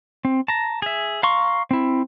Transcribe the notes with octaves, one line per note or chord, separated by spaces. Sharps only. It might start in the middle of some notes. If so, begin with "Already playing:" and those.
C4
A5 A#5
G#4 E5
F5 A#5 C6 C#6
C4 E4